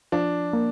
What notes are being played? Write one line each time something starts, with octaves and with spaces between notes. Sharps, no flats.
F3 D4
A#3